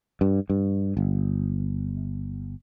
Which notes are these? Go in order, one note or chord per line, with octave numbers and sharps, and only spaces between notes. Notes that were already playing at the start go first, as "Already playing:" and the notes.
G2
G2
G1